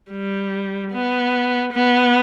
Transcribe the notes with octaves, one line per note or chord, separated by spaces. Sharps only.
G3
B3
B3